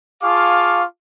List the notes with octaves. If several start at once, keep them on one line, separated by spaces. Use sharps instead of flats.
F4 G#4 F5 A5 C#6 D6